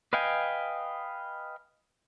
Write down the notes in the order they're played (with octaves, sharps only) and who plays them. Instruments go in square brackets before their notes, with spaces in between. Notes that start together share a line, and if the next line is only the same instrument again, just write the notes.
[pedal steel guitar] B4 D#5 F5 G5 G#5